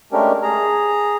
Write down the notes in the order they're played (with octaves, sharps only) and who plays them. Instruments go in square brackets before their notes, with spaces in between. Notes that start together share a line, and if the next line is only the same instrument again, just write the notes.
[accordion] G#3 A3 C#4 D4 G4 A#4
G#4 A#5